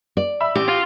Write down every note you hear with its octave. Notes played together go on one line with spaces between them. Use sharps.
D5
E5 B5 E6
A1 G4
F4